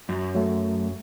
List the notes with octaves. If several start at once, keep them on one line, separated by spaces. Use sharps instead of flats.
F#2
F#3 A3